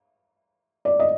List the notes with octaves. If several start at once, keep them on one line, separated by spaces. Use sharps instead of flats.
D5
D#5